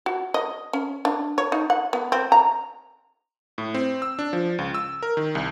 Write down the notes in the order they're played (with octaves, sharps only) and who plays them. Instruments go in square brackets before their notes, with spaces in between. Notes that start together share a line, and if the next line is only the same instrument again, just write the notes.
[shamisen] F#4
D#5
C#4
D4
C#5
D#4
F#5
B3
C4
A#5
[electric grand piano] A2
C4
E6
D4
F3
C#2
E6
A#4
D#3
C2